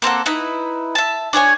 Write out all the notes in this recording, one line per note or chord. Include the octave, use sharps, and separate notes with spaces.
A#3 C4 A4 F#5
D#4 E4 B4
E5 A5
D4 G#4 C#5 G#5